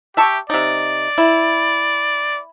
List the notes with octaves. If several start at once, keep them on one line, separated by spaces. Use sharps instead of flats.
G4 E5 A5 C#6
C3 D#4 D5
E4